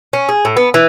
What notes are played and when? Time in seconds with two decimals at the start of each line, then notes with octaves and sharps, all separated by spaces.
0.13 C#4
0.29 G#4
0.45 A2
0.57 B3
0.74 E3